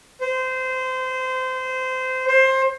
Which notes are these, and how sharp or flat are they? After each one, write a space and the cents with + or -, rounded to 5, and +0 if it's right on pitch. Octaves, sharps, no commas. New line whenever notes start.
C5 -20
C5 +20